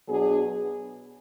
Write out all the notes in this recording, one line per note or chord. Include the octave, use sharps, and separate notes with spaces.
B2 F#3 B3 D4 G#4